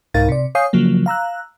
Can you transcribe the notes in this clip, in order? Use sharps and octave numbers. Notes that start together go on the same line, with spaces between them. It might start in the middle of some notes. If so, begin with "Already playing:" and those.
C2 G#2 D#4 A#4 F5 A6
C3 D5
C#5 F5 G#5 D#6 G6 C7
C#3 F3 F#3 A#3
F5 A#5 E6 F#6